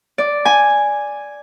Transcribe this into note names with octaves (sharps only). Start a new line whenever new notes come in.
D5
G#5